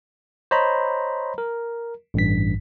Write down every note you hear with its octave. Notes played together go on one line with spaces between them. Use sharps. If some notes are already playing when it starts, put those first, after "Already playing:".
C5 C#5 D#5 A#5 B5
A#4
A1 G2 B6